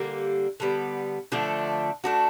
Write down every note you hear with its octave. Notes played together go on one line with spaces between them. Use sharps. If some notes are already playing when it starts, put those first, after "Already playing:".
Already playing: D3 G3 A#3
D3 G3 B3
D3 F3 A3 D4
A3 D4 F#4